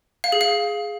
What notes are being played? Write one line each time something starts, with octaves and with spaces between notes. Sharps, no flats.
F5
G#4
F5